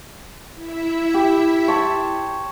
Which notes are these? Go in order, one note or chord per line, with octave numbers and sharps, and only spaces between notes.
E4 E5
G4
C#5 A5 C6